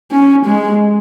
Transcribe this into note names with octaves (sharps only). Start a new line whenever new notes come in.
C#4
G#3